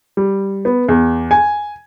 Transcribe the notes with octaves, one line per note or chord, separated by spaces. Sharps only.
G3
B3
E2
G#5